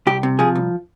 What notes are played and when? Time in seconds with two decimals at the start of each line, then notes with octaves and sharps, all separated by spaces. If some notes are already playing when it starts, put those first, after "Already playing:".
0.07 C2 G4
0.23 C3
0.39 F3 G#4
0.55 C2